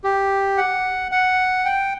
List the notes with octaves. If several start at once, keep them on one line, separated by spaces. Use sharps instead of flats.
G4
F#5
F#5
G5